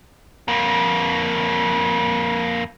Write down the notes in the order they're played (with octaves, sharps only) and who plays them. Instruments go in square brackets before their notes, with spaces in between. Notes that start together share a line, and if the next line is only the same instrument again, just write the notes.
[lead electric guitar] F2 A#3